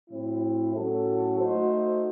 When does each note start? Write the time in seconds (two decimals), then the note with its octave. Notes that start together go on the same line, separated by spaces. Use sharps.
0.10 A2 F#3 C4 E4
0.75 A2 F#3 C#4 F#4 A4
1.39 A3 D#4 F#4 C5